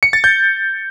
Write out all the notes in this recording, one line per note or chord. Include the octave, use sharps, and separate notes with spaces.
C#7
A6
G6